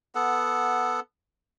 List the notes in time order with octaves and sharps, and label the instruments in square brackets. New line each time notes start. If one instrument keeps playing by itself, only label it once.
[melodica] B3 A4 F#5